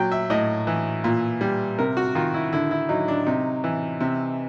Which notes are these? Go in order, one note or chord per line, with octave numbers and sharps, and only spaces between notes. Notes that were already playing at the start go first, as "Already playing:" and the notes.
Already playing: A#2 F#3 G5
E5
A2 D#5
E3
A#2
G3
C3 A#4
F#4
D#3 F4
E4
D3 E4
E4
F#3 D#4
D4
C3 D#4
E3
C3